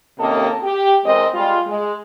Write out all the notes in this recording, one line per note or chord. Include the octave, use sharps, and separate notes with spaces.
D#2 C3 A#3 C#4 A4 D#5
G4
E2 G#3 C4 A#4 D#5
G3 G#3 F4
G#3